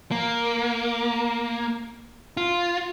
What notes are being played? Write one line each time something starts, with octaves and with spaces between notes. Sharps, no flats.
A#3
F4